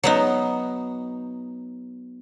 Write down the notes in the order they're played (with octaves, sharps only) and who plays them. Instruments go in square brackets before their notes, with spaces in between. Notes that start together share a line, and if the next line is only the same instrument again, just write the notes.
[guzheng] F#3 B3 D#4